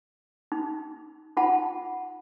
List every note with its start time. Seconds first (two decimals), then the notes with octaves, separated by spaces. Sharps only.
0.52 D#4
1.37 D#4 F4 F#5 A5 B5